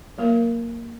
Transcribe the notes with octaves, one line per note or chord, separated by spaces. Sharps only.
F#3 A#3 A#4